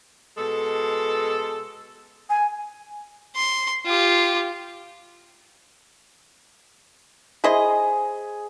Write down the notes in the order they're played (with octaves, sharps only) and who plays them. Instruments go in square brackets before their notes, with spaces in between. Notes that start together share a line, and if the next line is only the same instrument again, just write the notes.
[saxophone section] B2 G#3 A4
[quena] G#5
[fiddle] C6
F4 G4
[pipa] E4 C5 D#5 [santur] G#4